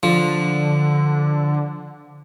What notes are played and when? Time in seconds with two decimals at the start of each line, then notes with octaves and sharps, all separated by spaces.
0.03 D3 F3